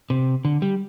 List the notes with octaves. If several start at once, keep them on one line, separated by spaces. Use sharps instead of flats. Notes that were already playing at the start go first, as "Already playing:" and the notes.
C3
D3
G3